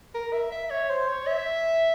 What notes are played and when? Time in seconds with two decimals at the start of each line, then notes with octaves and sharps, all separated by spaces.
0.14 A#4
0.33 E5
0.52 E5
0.70 C#5
0.89 C5
1.08 C#5
1.27 E5